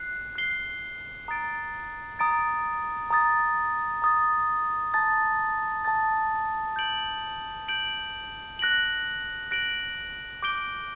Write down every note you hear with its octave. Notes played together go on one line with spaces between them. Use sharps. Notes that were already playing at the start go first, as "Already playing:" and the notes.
Already playing: F#6 C7
F#6 C7 G7
A#5 D#6 A6 D7
A#5 D#6 A6 D7
A#5 D#6 A6
A#5 D#6 A6
A5 D#6 A6
A5 D#6 A6
G6 D7 F#7
G6 D7 F#7
F#6 A#6 D7 F#7
F#6 A#6 D7 F#7
D6 G6 D7 G7